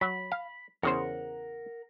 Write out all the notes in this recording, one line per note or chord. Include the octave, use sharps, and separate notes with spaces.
F#3 B5
F5
E2 C#3 A#4 C5 F#5